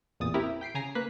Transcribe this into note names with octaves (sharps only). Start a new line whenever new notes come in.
A1 E2 A#2 D#6 A6
C4 E4 G4 A#4 E5 A#5
G5 B6 C7 D7
C#3 G#5 A#5 A#6 C7
A#3 B4 F#6 B6